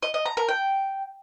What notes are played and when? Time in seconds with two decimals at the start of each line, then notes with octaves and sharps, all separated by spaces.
0.03 D#5
0.14 D#5
0.26 A#5
0.37 A#4
0.49 G5